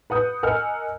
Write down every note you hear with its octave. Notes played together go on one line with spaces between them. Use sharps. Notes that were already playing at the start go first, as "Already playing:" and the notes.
B4 F#5 D#6 G6
A#4 D#5 F#5 G#5 E6 F6